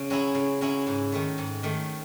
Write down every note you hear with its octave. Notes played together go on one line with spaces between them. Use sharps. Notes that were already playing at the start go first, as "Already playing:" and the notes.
Already playing: C#3
F#3 C#4 E4 G#4
C#3
F#3 C#4 E4 G#4
G#2
D#3 A3
G#2
D#3 A3